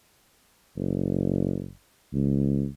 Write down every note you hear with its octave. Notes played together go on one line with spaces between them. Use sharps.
F#1
C#2